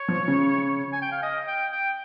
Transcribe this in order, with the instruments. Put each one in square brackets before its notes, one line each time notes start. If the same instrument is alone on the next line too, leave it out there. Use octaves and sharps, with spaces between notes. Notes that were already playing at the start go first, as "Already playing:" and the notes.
Already playing: [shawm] C#5
[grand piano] F3
C#3
[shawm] G#5
G5
F5
D#5
G5
G5